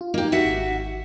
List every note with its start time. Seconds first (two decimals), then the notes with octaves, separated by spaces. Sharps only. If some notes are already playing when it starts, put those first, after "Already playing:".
0.01 F4
0.14 A#3 D#4 G4
0.32 D#4 F#4 G4 E5 F#5
0.45 G#1